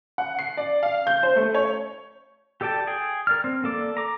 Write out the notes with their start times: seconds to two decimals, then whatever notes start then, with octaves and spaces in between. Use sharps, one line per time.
0.18 F#5
0.39 C7
0.57 D5
0.83 F5
1.07 G6
1.23 C5
1.36 A3
1.55 C#5
2.61 G4 A4 D5 G5 A5
2.87 G#4 G5
3.27 A#4 D5 F6
3.44 C4
3.64 A#3 A4 D5
3.97 A#5 D6